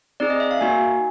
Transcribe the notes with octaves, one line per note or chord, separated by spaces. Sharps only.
C4 D#4 G#4 D5
D#5
E5
F5
A#3 D#4 F#4 G#5